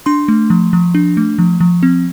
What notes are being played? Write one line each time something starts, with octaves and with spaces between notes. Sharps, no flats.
D4 C6
A3
F3
F3
D4
A3
F3
F3
C4